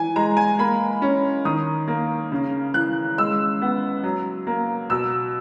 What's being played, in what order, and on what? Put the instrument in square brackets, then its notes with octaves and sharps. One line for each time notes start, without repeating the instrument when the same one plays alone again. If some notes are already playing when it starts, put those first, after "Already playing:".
Already playing: [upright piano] E3 G#5
G#3 A#5
G#5
A#3 B5
C#4
D#3 D#6
A#3
C#3
E3 F#6
G#3 E6
B3
F#3
A#3
B2 E6